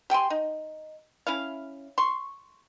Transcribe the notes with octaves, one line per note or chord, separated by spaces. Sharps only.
G4 G5 G#5 C6
D#4
C#4 E4 F5
C6 C#6